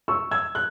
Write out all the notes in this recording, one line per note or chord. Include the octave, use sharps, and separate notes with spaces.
C#6 E6
E6 G#6
F#6